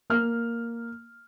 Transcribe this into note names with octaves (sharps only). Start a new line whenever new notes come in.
A#3 F6